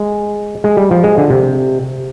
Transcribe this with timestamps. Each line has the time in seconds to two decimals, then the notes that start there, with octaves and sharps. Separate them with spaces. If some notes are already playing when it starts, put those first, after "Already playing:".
Already playing: G#3
0.64 G#3
0.77 G3
0.91 F3
1.04 G#3
1.18 D3
1.30 C3